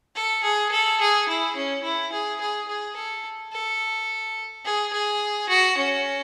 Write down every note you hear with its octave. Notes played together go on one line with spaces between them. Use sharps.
A4
G#4
A4
G#4
E4
C#4
E4
G#4
G#4
G#4
A4
A4
G#4
G#4
F#4
C#4